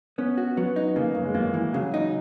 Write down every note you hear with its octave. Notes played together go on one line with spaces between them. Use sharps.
B3 C#4
F#4
F#3 B3
D#4
C#3 A#3
F#2
G#3
F#2 A#3
E3
C#3 F#3
D#4